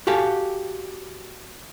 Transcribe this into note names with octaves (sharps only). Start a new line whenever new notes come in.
F#4 G4 A4 F5 G#5